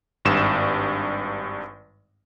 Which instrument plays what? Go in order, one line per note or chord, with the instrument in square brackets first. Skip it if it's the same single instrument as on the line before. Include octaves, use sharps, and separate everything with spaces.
[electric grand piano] G#1 G2 E7